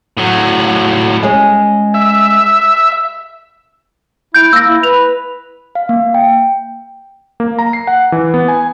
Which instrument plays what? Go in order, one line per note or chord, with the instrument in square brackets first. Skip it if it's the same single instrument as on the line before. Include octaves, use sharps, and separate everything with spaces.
[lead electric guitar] A2 F#3
[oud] G#3 C#4 G#4
[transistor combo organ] E5
[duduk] E4 [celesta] G6 D7
[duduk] A#3 [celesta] E6 A#6
[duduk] E4
[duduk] B4 [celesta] F7
[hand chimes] F5
A#3
G5
[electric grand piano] A#3
A#5
C7
F#5
E3
B3
G#5